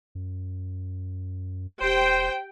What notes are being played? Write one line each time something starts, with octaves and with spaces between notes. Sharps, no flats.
F#2
E1 G4 C5 G5